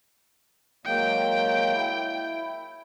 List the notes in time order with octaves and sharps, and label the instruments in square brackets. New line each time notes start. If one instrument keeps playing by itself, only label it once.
[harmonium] F#3 G#3 A#3 [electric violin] G5
[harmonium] E4